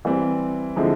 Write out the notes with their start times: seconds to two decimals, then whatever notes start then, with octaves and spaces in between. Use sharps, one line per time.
0.05 E3 G3 C4
0.76 D3 F3 G#3 C4 E4